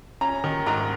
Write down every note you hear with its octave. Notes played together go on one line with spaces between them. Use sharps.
C#4 A#5
D#3
G#2 A#5